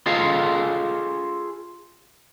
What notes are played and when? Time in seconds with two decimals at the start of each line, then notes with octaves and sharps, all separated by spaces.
0.06 F4 G#4 A4 C5 D#5 F5